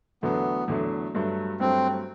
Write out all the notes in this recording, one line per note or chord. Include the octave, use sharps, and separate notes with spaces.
E2 D3 F#3 A3 B3
E2 D3 F#3 A3
G2 F#3 A3
G2 F#3 A3 C4